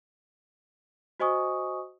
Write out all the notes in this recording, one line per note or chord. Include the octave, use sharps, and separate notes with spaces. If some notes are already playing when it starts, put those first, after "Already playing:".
F#4 C5 D#5 G#5 C#6 D#6